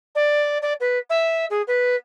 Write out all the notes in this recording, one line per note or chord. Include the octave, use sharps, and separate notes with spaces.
D5
D5
B4
E5
G#4
B4